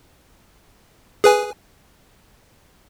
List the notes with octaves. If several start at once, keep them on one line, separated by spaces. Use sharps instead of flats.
G#4 B4 G#5